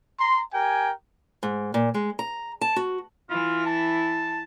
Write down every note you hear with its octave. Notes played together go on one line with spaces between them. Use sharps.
A#5 C6
G4 A#4 G5 G#5
G#2
A#2
G#3
A#5
A5
F#4
E3 E4 F4
A5